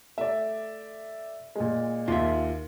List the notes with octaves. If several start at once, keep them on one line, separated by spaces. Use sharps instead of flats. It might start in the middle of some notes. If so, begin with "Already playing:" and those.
A3 D5 E5
A#2 G#3
D#2 F4 E5